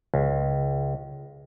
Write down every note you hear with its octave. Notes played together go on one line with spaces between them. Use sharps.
C#2